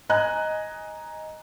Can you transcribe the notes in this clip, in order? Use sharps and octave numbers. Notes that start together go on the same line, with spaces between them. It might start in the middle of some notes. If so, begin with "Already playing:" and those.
D#5 G#5 A#5 F#6